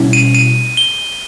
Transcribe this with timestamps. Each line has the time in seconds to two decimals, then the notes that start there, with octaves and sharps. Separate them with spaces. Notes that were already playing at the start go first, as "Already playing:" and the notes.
Already playing: B2 G3 C#4 E4
0.13 D#7
0.35 D#7
0.77 G7